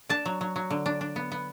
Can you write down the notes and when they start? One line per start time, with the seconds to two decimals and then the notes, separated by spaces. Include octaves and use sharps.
0.09 D4 A5
0.26 F#3
0.41 F#3
0.56 F#3
0.70 D3
0.86 D4
1.01 D4
1.16 B3
1.32 B3